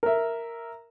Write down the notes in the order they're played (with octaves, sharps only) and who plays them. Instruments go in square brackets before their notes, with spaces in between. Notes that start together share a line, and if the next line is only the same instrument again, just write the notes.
[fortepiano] A#4 E5